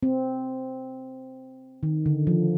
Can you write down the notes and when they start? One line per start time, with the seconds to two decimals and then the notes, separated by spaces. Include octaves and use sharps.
0.03 C4
1.83 D#3
2.06 D3
2.27 F3